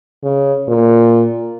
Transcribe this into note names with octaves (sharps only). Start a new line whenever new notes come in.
C#3
A#2